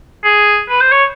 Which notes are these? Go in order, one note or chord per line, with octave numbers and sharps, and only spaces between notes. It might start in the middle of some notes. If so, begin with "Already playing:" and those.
G#4
B4
C5
C#5